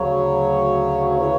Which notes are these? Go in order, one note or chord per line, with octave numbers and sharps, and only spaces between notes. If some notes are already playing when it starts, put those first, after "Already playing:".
Already playing: D2 C#3 F#3 C#5
C#3 E3 C#5